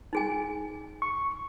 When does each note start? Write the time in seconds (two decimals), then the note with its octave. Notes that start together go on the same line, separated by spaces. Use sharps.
0.13 D#4 G#4 G#5
1.02 C#6